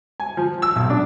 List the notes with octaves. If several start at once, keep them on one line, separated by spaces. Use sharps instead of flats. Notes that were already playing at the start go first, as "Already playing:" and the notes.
G#5
F3
E6
B1
D4